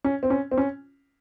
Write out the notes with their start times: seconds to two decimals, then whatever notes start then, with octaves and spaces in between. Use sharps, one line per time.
0.04 C#4
0.23 C4
0.30 C#4
0.51 C4
0.58 C#4